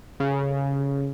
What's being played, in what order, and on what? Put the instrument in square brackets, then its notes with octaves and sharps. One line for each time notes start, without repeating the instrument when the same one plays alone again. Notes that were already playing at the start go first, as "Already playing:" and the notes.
[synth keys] C#3